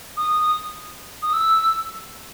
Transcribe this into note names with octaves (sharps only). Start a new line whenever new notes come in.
D#6
D#6
E6